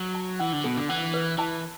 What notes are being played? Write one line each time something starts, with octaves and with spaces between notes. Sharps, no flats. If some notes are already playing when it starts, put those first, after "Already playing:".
Already playing: F#3
A5
E3 F#5
D3
B2 A4
D3
E3 F#5
B4
E3 A5